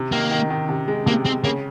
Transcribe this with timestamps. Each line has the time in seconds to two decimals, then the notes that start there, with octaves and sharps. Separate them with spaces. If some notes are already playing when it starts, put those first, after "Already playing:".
Already playing: C3
0.12 D#3 A#3
0.31 D#3
0.50 D#3
0.69 C3
0.88 G#3
1.06 C3 A#3
1.25 G#3 C4
1.44 C#3 A#3